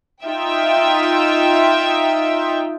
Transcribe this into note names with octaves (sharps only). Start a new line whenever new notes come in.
D#4 F4 E5 G5